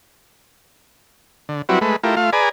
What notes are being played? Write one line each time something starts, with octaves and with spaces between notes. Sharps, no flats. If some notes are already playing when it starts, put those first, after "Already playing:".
D3
F#3 G3 C4 E4 F#4 B4
G#3 A3 B4
A3 E4 F4 G4 A#4
A3 F4 F5
G#4 B4 D5 G#5 A#5